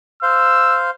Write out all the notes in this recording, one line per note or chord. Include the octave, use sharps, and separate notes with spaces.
C5 F5 E6